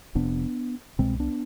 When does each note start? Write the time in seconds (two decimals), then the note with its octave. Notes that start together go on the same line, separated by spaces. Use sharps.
0.15 F1 F2 C3 B3 D4
0.99 C2 B2 G#3 C4
1.20 B3 D4